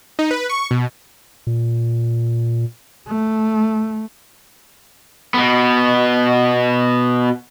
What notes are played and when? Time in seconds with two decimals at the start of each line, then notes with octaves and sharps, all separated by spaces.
0.19 D#4
0.31 B4
0.49 C#6
0.71 B2
1.47 A#2
3.07 A3
5.34 B2 B3